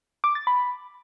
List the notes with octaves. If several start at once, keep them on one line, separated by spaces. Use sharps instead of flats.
D6
A6
B5